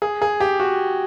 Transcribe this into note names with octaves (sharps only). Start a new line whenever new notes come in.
G#4
G#4
G4
F#4